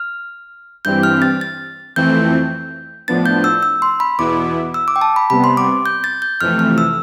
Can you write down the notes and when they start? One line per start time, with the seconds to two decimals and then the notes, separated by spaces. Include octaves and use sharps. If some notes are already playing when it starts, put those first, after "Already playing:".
Already playing: F6
0.85 G2 E3 G3 C4 G4 G6
1.03 F6
1.22 A6
1.41 A6
1.96 F2 E3 A3 C4 G6
3.08 A2 F3 B3 D4 A6
3.26 G6
3.44 E6
3.63 E6
3.82 C6
4.00 B5
4.18 E2 B2 B3 E4 D6
4.74 E6
4.88 D6
4.96 G5
5.01 A5
5.16 B5
5.30 C3 G3 B3 B5
5.44 C6
5.57 D6
5.86 G6
6.04 A6
6.22 G6
6.41 F2 C3 E3 A3 F6
6.59 F6
6.78 E6